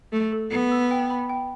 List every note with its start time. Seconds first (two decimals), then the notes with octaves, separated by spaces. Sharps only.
0.12 A3 A4
0.32 A4
0.51 B3 A4
0.71 E6
0.91 G5
1.10 B5
1.29 G5